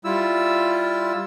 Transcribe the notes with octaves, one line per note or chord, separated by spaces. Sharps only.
G3 E4 F4 E6